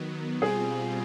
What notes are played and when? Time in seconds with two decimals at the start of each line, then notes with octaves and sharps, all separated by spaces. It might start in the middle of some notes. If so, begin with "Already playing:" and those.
Already playing: D#3 F#3 B3
0.41 B2 G3 C4 F4 G#4